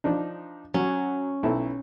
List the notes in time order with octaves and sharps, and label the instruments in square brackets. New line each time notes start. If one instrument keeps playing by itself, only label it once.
[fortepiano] F3 D4 D#4
[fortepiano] F#3 [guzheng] C#4
[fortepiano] B1 E4 A4